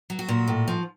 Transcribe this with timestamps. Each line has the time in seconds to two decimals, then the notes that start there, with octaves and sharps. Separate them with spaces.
0.10 F#3
0.19 F#4
0.28 A#2
0.48 A2
0.68 F3